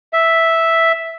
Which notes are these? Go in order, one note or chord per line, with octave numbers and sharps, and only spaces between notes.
E5